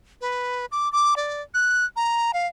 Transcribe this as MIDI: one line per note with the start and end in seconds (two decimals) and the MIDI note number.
0.21 0.66 71
0.72 0.91 86
0.92 1.14 86
1.16 1.42 74
1.54 1.85 90
1.96 2.31 82
2.34 2.47 77